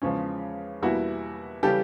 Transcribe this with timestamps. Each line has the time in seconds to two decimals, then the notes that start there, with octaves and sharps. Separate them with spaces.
0.02 E2 C#3 F3 G#3 C#4
0.83 E2 B2 G3 A#3 E4 F#4
1.63 C#3 E3 G3 G4 A4